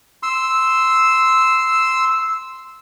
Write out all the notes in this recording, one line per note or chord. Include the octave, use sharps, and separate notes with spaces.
C6 E6